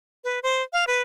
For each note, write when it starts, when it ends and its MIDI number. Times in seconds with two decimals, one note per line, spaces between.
0.24 0.39 71
0.43 0.62 72
0.73 0.85 77
0.87 1.02 71